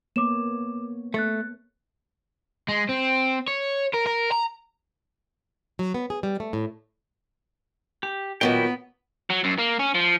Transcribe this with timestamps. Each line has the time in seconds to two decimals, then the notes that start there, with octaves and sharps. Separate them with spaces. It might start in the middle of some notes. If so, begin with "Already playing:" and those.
0.16 A#3 B3 C#5 D6 E7
1.14 A3 F#6 A6 C#7
2.68 G#3
2.89 C4
3.48 C#5
3.94 A#4
4.07 A#4
4.32 A#5
5.79 F#3
5.94 B3
6.10 G#4
6.23 G3
6.40 A3
6.53 A2
8.03 G4
8.41 A#2 D#3 F#3 B3 E4 G5
9.30 F#3
9.44 F#2
9.58 A#3
9.79 C#4
9.95 F3